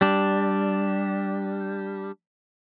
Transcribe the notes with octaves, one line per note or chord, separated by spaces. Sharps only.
G3 D4